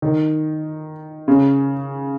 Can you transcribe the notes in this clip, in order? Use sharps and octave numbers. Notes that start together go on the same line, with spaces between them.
D#3
C#3